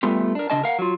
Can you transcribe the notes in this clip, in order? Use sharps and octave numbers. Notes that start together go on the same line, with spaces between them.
G3 A3 B3 F4 G4
D4 A#4
C#3 D4 D#5 A5
A#4 F5 F#5
F#3 F4